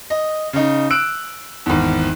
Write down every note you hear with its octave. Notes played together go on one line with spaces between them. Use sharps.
D#5
C#3 D#4
E6 F#6 D7
G#1 E2